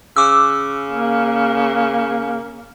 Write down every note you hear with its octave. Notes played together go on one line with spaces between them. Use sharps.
C#3 D6 E6
A#3